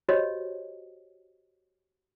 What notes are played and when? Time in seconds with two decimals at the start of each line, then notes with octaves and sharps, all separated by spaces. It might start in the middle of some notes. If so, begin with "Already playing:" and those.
0.09 F#4 G4 C5 C#5 D#5